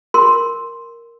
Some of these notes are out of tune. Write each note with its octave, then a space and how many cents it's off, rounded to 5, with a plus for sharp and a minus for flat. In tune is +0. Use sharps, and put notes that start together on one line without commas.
A#4 +0 C6 +0